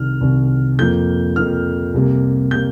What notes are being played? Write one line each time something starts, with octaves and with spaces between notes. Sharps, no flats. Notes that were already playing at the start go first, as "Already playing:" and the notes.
Already playing: C2 C3 D#3 F6
C2 C3 D#3
F2 F3 A#3 G6
F2 F3 A#3 F6
C2 C3 G3 A#3
C3 G3 A#3 G6